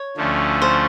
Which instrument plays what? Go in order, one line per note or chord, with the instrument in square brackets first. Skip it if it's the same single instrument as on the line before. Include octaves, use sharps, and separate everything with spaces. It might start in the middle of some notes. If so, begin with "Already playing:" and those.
Already playing: [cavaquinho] C#5
[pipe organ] D2 D3 F3 A3 C#4
[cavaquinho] C5